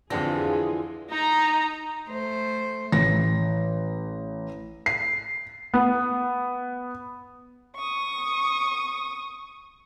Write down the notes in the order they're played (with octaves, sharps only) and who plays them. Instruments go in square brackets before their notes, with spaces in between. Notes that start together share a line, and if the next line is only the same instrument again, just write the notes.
[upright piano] F2 D3 A#6 [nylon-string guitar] E3 D4 G4 [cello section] F4 G#4
[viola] D#4 A#5
[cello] A3 C5
[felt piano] A1 A#6
C7
B3
[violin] C#6 D#6